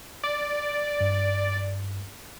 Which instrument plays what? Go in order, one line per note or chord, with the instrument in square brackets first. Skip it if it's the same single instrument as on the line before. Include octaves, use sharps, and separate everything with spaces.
[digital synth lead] D5
[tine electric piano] G2